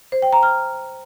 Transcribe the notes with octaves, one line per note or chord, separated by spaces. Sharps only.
C5
G5
A#5
F6